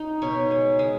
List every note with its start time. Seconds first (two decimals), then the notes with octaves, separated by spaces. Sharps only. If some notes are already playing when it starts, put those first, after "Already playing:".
Already playing: D#4
0.22 B2 C#5
0.51 G#3
0.79 G#3